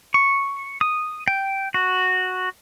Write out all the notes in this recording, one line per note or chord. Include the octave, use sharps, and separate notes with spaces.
C#6
D#6
G5
F#4